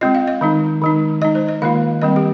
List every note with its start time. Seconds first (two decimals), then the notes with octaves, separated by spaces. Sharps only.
0.01 G#3 C4 F4 D#5
0.15 F5
0.28 D#5
0.41 D#3 G#3 D#4
0.82 D#3 G#3 D#4
1.21 G#3 D#4 D#5
1.35 C5
1.49 D#5
1.62 D#3 A#3 F4 F5
2.02 D#3 G3 C4 D#5
2.16 G4